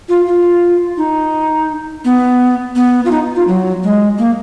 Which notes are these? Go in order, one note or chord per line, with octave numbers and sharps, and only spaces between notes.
F4
F4
D#4
B3
B3
F4
D#4
F4
F#3
G#3
A#3